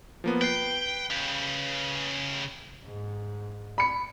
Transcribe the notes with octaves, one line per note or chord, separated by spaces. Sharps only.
F3 A#3 B3
B4 G5 C7
C#3 G4
G#2
B5 C#7